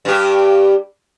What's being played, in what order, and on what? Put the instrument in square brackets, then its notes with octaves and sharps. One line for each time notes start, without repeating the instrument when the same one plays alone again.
[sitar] G2 G4